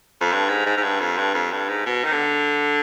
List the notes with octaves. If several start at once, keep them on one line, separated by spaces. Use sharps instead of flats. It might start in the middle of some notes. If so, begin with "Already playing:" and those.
F2
G2
G#2
G#2
G#2
G2
F2
G2
F2
G2
G#2
B2
D#3
D3